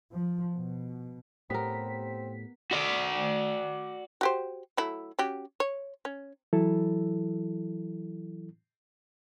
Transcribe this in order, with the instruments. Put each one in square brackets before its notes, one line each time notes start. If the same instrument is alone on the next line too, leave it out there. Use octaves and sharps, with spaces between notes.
[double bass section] F3
B2
[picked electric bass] A2 [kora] B3 A#4 [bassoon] C4 [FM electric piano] G4 B6
[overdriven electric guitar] F#4 D5
[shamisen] F#4 G4 C5
F#3 A3 E4
C#4 F#4 G4
C#5
C#4
[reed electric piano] E3 F#3 E4 A4